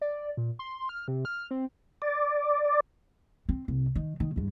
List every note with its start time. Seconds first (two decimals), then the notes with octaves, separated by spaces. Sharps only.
0.01 D5
0.37 A#2
0.59 C6
0.89 F6
1.08 C3
1.25 F6
1.51 C4
2.02 D5
3.49 C4
3.68 C2
3.95 D#3
4.20 D#3
4.36 E2 G2